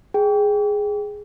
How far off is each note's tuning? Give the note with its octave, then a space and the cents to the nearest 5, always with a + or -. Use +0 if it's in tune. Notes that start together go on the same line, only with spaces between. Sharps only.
G#4 +0 G5 +0